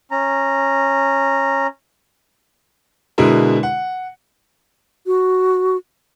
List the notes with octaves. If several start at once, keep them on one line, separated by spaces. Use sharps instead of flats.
C#4 A#5
B2 D3 G#3 E4 A#4
F#5
F#4